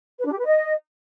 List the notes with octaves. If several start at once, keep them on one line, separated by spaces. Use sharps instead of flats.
B4
D4
G4
B4
D#5